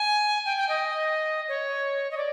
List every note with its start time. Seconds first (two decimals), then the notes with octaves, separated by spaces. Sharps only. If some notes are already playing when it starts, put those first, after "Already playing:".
Already playing: G#5
0.46 G5
0.57 G5
0.69 D#5
1.49 C#5
2.11 D#5
2.17 D5